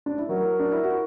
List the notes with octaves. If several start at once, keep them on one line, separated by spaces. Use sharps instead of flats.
D4
E4
F#3 F#4 A#4
D4
E4
F#4